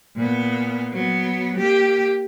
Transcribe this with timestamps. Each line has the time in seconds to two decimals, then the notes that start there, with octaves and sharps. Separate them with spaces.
0.16 A#2 B3
0.92 F#3 B3
1.56 A#3 G4